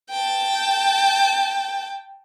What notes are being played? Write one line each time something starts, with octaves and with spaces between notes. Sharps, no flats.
G5 A5